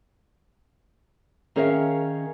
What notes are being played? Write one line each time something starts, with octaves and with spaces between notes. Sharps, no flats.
D#3 C#4 G#4 A#4 E5 F5